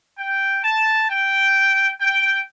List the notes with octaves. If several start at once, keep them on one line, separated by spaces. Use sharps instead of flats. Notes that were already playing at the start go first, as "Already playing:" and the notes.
G5
A5
G5
G5